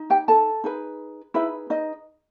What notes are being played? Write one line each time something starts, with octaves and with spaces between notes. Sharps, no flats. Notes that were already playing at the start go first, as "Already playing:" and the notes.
Already playing: D#4
G4 G5
A4 A5
D#4 G#4 B4
D#4 E4 G#4 B4 E5
D#4 D#5